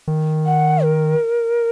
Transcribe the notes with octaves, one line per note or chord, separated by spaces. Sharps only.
D#3
F#5
A#4